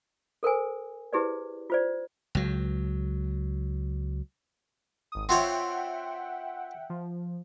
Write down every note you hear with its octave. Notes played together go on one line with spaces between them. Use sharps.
A4 A#4 C5 G#5
E4 G4 G#4 B4 C5 D5
F4 C5 D5
C#2 F#3
G#1 D#6
C4 F4 C#5 E5 F#5 G5
F3